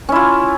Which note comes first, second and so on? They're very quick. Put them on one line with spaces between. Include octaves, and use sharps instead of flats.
C#4 E4 F4